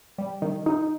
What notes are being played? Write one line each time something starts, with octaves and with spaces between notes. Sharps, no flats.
G3
D#3
D#4